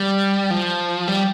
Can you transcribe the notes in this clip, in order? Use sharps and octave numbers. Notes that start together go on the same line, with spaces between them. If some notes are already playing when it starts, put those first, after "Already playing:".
Already playing: G3
F3
G3